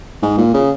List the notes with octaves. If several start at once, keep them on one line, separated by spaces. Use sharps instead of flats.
G#2
A#2
C#3